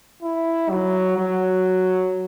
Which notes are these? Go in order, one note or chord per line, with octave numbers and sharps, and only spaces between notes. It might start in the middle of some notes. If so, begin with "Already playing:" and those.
E4
F#3
F#3